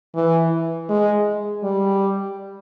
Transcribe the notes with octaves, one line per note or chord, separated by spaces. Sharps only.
E3
G#3
G3